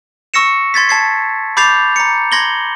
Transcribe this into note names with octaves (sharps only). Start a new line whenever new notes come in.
C#6 E6 A#6 C#7 E7
C6 G#6 A6 B6
A5 G#6 C7
B5 D6 G6 A6 C7 F7
A#5 C#7
C6 G#6 A#6 F#7 G7